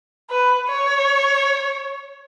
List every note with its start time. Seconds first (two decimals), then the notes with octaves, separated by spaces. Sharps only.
0.30 B4
0.68 C#5